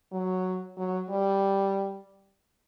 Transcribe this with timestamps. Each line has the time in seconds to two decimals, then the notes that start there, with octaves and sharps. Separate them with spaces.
0.12 F#3
0.77 F#3
1.09 G3